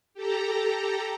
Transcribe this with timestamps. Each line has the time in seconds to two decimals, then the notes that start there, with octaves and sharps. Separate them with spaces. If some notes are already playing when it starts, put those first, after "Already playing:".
0.14 G4 A4 A#5